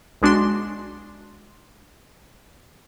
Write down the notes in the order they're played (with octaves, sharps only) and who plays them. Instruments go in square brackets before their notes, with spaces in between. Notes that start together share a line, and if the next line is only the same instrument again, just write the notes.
[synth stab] B1 G#3 D4 F#4 C6